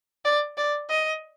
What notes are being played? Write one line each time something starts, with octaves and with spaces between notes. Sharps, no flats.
D5
D5
D#5